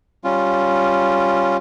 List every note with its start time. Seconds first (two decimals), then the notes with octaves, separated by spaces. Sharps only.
0.24 G3 C#4 F4